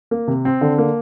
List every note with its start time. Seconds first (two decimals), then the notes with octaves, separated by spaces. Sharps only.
0.11 A#3
0.27 C3
0.45 C4
0.61 D3
0.78 A#3